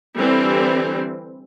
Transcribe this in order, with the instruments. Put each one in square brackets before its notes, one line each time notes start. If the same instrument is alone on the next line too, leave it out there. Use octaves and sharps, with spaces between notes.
[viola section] D3 E3 G3 C4